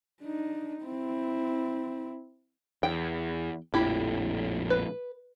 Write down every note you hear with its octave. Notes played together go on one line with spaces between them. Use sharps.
D4 D#4
C4 E4
E2 G5
A#1 F2 A2 E4 G4
B4